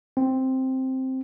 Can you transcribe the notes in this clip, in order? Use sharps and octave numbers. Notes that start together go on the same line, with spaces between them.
C4